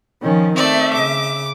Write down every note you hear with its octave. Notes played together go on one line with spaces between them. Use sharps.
D#3 F3 C#4
A3 C4 D5 E5
C#3 D6